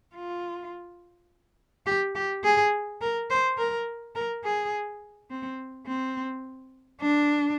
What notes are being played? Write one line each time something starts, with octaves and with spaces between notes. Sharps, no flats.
F4
G4
G4
G#4
A#4
C5
A#4
A#4
G#4
C4
C4
D4